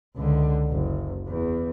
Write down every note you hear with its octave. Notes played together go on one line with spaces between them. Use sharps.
C#2 D3
F#1
E2